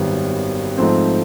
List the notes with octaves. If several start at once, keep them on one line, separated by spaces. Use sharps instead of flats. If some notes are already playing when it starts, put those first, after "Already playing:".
Already playing: G#1 F#2 D#3 G3 B3
G#2 F3 A3 C4